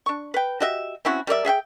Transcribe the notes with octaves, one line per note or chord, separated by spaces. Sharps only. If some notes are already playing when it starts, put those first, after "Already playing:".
D4 C#6
B4 G5
F#4 G4 D#5 E5
C4 C#4 E4 F#4
G3 A#4 D5 E5
G#4 E5 F#5 G5